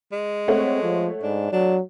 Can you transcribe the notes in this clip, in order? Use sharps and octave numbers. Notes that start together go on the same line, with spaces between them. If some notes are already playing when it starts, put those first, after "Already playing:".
G#3
A3 C4 C#5 F#5
F3
G#2 D4
F#3 D4